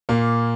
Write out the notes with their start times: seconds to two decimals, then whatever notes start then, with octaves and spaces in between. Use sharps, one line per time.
0.09 A#2 A#3